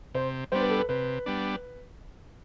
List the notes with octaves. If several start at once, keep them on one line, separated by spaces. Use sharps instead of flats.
C3 C5
G3 B3 D4 C5
B4
A4
B4
C3 B4
G3 B3 D4